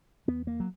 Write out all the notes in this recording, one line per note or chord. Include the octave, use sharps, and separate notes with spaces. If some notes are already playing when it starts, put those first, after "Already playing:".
E2 B3
A#3
F#3